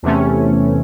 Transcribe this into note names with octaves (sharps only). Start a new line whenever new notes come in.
E2 C3 E3 A3 C#4